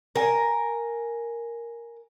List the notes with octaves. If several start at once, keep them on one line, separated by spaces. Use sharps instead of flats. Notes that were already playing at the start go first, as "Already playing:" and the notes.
A#4 G#5